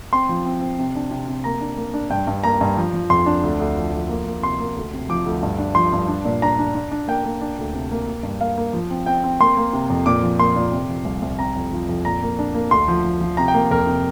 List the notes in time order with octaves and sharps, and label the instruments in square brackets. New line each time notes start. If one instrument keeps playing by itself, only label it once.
[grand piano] C4 C6
F3
C4
C4
C3
D4
C3
C3
A#3 A#5
D4
A#3
D4
G2 G5
G2
A#3 A#5
G2
F3
F3
F2 C6
D4
D2
D2
F3
F3
A#3
A#3
C3 C6
A#3
D2
C3
F3 D6
D2
G2
D4
F3 C6
G2
D4
A#2
D4 A#5
D4
D4
D4
A#3 G5
A#3
D4
D2
C3
A#3
A#3
G2
A#3 F5
A#3
F3
C4
C4 G5
C4
A#3 C6
A#3
C3
F2
A#2 D6
F3
A#3 C6
A#2
C3
F3
C2
C2
C4 A#5
F2
F3
F2
A#2 A#5
A#3
D4
A#3
D2 C6
F3
F3
F3
C3 A#5
G5
A#3
F2 A#4
C3